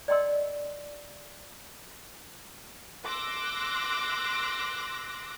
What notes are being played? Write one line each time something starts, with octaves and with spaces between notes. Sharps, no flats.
D5 D#5 G5 C6 E6
C6 D6 E6 F#6 A#6 D7